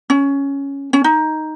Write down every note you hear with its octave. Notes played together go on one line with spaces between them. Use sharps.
C#4
C#4
D#4